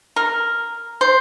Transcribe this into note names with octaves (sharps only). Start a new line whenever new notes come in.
A#4
C5